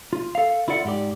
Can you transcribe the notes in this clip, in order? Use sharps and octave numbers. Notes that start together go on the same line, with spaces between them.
F4
A4 F5
E4 F4 A4 D5 F#5
G#2 G4 D5